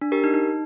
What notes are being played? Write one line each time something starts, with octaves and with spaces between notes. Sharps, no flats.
D4
G4 A#4
D#4
D#4